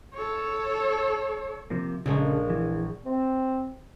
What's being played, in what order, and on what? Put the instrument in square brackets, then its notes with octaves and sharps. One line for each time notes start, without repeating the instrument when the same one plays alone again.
[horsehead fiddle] A4 C#5
[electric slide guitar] C3 F3 A#3
[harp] A#1 G#3 [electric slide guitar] C#3 A4
[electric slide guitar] E3
[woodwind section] C4